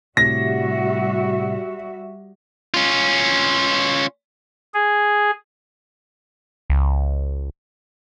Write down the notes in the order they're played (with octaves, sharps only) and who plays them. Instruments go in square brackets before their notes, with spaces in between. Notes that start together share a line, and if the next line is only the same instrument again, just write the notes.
[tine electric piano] A2 C3 [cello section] G3 F#4 E5 [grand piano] A#6
[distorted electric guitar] C#4 F4
[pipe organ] G#4
[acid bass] C#2